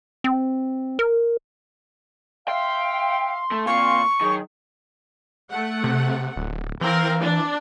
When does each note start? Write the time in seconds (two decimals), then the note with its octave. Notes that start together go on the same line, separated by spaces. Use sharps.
0.24 C4
0.99 A#4
2.48 E5 F5 G5 C6
3.51 A3
3.66 A#2 C4 F5 C#6
4.21 D#3 F#3 G#4
5.50 A3 F#5
5.84 C3
6.37 D1
6.81 E3 C4 A#4 F5
7.21 D4